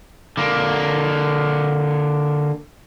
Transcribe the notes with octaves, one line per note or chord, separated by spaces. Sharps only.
D3 A#3